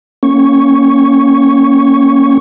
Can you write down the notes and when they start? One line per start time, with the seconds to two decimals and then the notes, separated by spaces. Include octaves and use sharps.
0.23 A#3 C#4 C#6